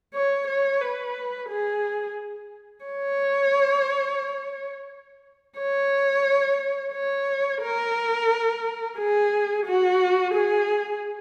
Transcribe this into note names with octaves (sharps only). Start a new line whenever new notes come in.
C#5
C#5
B4
G#4
C#5
C#5
C#5
A#4
G#4
F#4
G#4